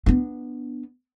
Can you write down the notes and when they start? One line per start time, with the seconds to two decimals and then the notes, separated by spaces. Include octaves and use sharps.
0.06 B3 D4